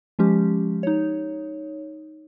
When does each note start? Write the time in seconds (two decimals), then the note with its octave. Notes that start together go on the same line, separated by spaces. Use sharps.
0.19 F3 G#3 C#4 G4
0.83 D#4 C#5